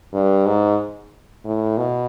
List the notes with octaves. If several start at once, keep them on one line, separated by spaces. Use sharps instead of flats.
G2
G#2
A2
B2